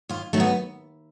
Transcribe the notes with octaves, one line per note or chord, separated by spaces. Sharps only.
D#2 F4
D#3 F#3 A3
B3